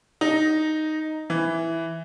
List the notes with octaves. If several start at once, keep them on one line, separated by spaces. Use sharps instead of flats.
D#4
E3